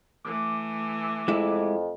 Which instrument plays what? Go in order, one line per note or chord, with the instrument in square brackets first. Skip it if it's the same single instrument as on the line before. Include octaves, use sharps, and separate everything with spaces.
[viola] E3 A3 [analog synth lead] D6
[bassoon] F2 [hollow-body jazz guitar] G#3 E4